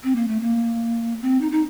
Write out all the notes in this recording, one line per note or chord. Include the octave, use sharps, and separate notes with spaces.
C4
A#3
A3
A#3
C4
D#4
D#4